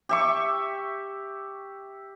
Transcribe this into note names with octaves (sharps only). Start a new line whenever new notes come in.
G4 E5 C#6